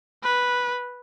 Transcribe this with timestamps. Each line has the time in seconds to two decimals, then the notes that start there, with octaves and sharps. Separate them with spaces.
0.24 B4